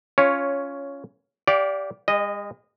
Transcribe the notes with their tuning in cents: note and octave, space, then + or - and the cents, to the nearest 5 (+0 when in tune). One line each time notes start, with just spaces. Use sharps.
C#4 +10 F4 -5 C#5 +0
G4 +0 D5 -20 F5 +30
G#3 -45 D#5 -10